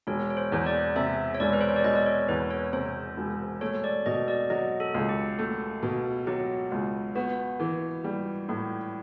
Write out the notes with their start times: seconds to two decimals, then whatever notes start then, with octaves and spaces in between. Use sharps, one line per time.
0.07 E1 C#5
0.30 C#5
0.37 C5
0.52 E2
0.66 D5
0.96 C3 E5
1.35 C#5
1.40 E1 D5
1.53 B4
1.61 C5
1.69 C#5
1.76 D5
1.84 E1 D#5
1.95 D5
2.06 C#5
2.29 E2 B4
2.51 C#5
2.73 C3 C5
3.17 E1
3.61 A3 C#5
3.84 D5
4.06 B2 D#5
4.28 D5
4.50 F#3 D#5
4.80 A4
4.94 C#2
5.09 G4
5.39 A3
5.83 B2
6.27 F#3 G4
6.72 C#2
7.15 B3 F#4
7.60 E3
8.04 G3
8.49 A2